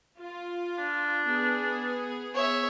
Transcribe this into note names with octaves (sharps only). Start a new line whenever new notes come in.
F4
D4
B3 G#4
C#5 E5